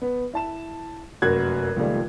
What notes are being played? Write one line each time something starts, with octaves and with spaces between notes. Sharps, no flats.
B3
E4 A5 E7
F1 F#2 A#3 F#4 F#6 G#6
C#2 A#2 D#3 F3 G3 A3